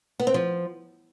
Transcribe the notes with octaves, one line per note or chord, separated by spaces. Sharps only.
B3
C4
F3